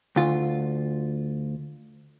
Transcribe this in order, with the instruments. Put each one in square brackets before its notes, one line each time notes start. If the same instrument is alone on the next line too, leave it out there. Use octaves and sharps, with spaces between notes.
[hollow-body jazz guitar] D2 F4